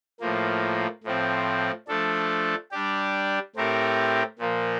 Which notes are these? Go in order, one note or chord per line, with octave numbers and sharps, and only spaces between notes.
A2 F3 A#3
A2 F3 C4
F3 A3 D4 A4
G3 D4 G4
A2 A3 C4 G4 A#4
A#2 F3 A#3